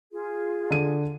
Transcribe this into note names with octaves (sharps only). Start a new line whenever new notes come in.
F4 G#4
D3 D#7